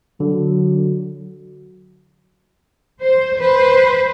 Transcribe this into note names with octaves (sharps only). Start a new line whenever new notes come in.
D3 F#3
C5
B4 C5